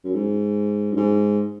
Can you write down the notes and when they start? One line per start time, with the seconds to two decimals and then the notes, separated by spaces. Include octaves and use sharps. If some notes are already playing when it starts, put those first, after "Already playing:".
0.04 F#2
0.14 G#2
0.92 F#2
0.97 G#2